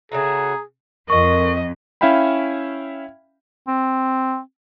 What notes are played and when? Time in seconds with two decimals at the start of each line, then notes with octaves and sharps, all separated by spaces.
0.12 C#3 A3 F#4 G#4 A#5
1.10 F2 A#4 D#5 C#6
2.01 C#4 E4 E5 F5 G5 B5
3.68 C4